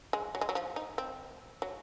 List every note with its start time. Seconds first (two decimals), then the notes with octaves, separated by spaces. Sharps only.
0.13 G#3
0.35 F#3
0.41 G#3
0.49 F#3
0.55 F3
0.76 D#4
0.98 C4
1.62 F#3